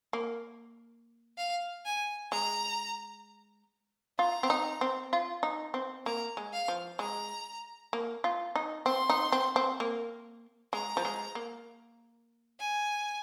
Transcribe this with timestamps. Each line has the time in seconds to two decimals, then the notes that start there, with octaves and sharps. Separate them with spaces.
0.13 A#3
1.38 F5
1.86 G#5
2.32 G#3 A#5
4.19 F4 A#5
4.43 C4
4.50 D#4
4.81 C4
5.13 F4
5.43 D#4
5.74 C4
6.06 A#3 A#5
6.37 G#3
6.53 F5
6.68 F3
6.99 G#3 A#5
7.93 A#3
8.24 F4
8.55 D#4
8.86 C4 C6
9.10 D#4
9.32 C4
9.56 C4
9.80 A#3
10.73 G#3 A#5
10.97 F3
11.05 G#3
11.35 A#3
12.60 G#5